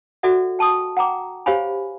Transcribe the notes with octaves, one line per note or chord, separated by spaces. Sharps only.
F#4 A4 D5 E5 F#5
G5 A5 C#6 D#6
F#5 G5 A#5 D6
G4 C5 C#5 F5 G#5 B5